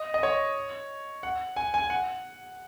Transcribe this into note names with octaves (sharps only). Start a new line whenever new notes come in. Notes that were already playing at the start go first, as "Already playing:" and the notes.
Already playing: D#5
D#5
C#5
F#5
G#5
G#5
F#5